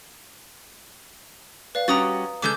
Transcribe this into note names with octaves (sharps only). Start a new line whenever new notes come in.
B4 D5 F5
G3 C#4 F#4 A#5 D#6 A6
C#3 G#3 A4 D6 E6 G6